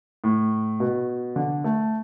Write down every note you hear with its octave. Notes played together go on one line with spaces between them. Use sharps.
A2
B2
D3
A3